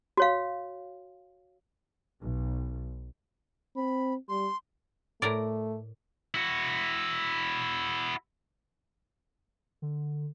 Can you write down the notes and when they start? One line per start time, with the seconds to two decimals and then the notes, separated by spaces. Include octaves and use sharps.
0.17 F#4 C#5 F5
2.22 B1
3.76 C4 B5
4.29 G3 C6
5.22 A2 A3 A#4 D5
6.35 E4 F#4
9.82 D3